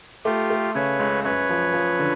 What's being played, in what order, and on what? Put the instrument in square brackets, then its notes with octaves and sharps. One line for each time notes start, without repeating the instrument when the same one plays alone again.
[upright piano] A3 [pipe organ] F4 G4
[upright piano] A3
[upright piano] C#3 [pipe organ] B4 C#5
[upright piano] C#2
[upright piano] F#2 [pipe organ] B4 C#5
[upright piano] F3
F3
D3